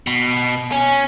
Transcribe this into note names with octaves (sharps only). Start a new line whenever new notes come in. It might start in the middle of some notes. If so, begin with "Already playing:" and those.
B2
C#4